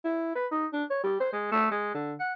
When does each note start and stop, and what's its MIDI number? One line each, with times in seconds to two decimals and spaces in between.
0.05 0.33 64
0.35 0.46 71
0.51 0.66 63
0.73 0.83 62
0.90 1.02 73
1.04 1.16 55
1.20 1.30 72
1.33 1.49 56
1.52 1.68 57
1.71 1.93 56
1.94 2.14 50
2.20 2.33 78